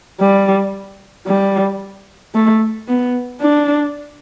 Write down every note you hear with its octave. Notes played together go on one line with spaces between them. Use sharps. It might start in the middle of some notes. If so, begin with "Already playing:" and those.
G3
G3
A3
B3
D4